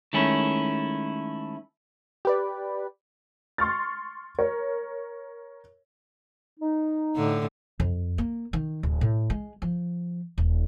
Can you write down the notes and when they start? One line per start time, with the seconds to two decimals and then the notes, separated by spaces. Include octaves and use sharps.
0.13 D#3 G#3 A3 C#4 E4
2.25 G4 B4 D5
3.58 C6 C#6 F6 A6
4.39 A#4 C#5
6.60 D#4
7.16 A2 D3
7.80 F2
8.18 A#3
8.53 D#3
8.83 D1
9.01 A2
9.30 G#3
9.62 F3
10.38 D#1